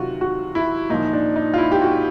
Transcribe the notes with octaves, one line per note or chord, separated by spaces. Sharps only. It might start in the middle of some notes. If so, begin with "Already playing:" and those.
Already playing: C3 D#3 F#3 F4 F#4
F#4
E4
A#2 F3 D#4
D4
D#4
F4
E4
G4
F#4